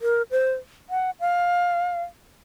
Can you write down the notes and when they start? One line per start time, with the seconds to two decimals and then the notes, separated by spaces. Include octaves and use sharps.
0.02 A#4
0.31 C5
0.90 F#5
1.20 F5